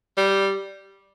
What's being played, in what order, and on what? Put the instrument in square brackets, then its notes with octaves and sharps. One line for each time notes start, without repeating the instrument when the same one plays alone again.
[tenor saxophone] G3